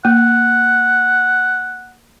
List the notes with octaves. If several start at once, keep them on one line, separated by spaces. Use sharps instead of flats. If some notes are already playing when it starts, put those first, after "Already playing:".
A#3 F#5